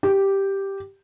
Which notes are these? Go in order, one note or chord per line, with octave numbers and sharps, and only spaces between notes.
G4